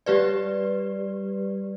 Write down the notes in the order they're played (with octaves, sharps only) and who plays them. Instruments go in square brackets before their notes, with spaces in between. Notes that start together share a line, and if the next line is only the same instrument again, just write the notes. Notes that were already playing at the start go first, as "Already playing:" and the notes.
[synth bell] G3 G4 B4 D5